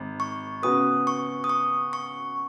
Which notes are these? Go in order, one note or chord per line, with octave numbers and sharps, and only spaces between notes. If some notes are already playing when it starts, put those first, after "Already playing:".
Already playing: G#1
C#6
C#3 B3 F#4 B4 D#6
C#6
D#6
C#6
C#6